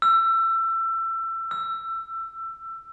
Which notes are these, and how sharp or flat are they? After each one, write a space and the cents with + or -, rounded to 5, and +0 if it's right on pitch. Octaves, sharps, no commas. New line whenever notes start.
E6 +25
E6 +20